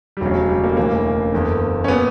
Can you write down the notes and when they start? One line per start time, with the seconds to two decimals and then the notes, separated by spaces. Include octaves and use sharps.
0.17 G3
0.21 E1 D2 C#3 F#3
0.35 F#3
0.49 G3
0.64 A#3
0.76 E1 D2 C#3 E3 A#3
1.32 F#1 E2 D3
1.84 C#4
1.88 A#2 B3